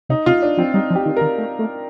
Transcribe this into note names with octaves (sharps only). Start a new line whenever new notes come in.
C3 D#4
C3 F4
D4
F3 C4
G3 D#4
F3
G4
D#3
D#3 A#4
A3
A3